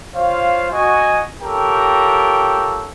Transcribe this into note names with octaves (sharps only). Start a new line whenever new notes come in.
F4 C5 C#5 F5
F#4 D#5 G#5
F4 G4 A4 A#4 C#5 G5